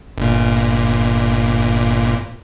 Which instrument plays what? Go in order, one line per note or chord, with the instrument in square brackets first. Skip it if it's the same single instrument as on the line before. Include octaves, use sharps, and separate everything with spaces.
[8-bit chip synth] G1 A#2